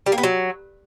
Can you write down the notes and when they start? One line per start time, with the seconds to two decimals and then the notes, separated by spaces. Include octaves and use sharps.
0.06 G3
0.12 A#3
0.18 B3
0.23 F#3